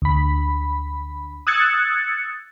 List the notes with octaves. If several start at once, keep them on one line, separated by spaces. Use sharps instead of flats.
D2 B5
D#6 E6 F#6 G#6 A6 C#7